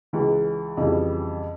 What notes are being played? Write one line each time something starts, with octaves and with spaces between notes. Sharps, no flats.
C#2 C#3 E3
F2 C#3 E3 G3